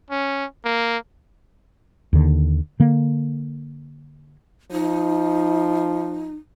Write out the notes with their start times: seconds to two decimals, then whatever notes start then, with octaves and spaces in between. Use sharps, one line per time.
0.11 C#4
0.65 A#3
2.13 D#2 D3
2.80 D3 A#3
4.71 F3 D#4